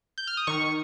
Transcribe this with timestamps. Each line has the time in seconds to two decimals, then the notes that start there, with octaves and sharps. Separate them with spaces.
0.18 G6
0.27 F6
0.37 D#6
0.47 D#3 C#6